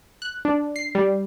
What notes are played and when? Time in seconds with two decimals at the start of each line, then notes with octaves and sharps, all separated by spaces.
0.22 F#6
0.45 D4
0.76 C7
0.95 G3